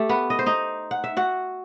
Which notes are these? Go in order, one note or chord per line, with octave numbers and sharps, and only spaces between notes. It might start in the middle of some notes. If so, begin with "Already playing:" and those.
Already playing: A3 G4 A4
B3 B4
D#5
C5
D#4 D#5
F#5
E5
F#4 F#5